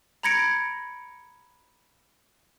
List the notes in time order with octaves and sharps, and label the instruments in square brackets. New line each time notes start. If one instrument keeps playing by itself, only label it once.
[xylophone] A#5 B5 G#6 A#6 C#7 D7